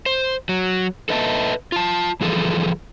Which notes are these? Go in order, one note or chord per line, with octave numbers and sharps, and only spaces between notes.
C5
F#3
A4 B4 D#5 E5 G5 A5
F4 A5
E3 F3 G#4 A4